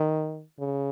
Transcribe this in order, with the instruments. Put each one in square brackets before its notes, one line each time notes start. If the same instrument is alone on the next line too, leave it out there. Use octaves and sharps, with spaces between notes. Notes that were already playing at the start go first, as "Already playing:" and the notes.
Already playing: [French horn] D#3
C#3